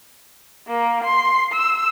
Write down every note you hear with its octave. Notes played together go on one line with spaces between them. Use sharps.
A#3
C6
E6